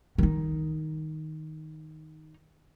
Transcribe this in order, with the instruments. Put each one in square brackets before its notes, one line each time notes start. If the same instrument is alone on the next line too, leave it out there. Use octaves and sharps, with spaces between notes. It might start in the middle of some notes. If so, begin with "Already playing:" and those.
[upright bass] D#3 D#4